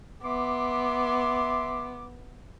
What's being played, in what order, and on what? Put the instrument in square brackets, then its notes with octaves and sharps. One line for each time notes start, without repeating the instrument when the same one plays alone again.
[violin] B3 [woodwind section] E5 C6 D6